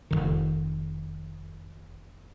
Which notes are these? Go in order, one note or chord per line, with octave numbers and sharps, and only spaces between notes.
F1 A#1 D#3